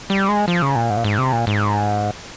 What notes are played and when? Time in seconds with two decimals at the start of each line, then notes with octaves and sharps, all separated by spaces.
0.10 G3
0.29 G#3
0.48 F3
0.62 C#3
0.76 A#2
0.90 G#2
0.97 A#2
1.04 G#2
1.18 C3
1.33 A#2
1.47 G#2